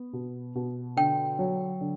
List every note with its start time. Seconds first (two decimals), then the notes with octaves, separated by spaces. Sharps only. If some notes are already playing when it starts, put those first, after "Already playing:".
Already playing: B3
0.13 B2
0.55 B2
0.97 D3 G5
1.39 F#3
1.81 D3